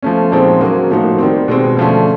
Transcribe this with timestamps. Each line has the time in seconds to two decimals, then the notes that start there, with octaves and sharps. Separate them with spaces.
0.03 F3 A3 C#4
0.31 A#2 F3 G#3 C4 D#4
0.61 F#3 A#3 C#4 F#4
0.90 A2 F3 A#3 D#4 F#4
1.18 D#3 G3 C4
1.48 B2 G#3 C4
1.77 D3 F3 A3 C#4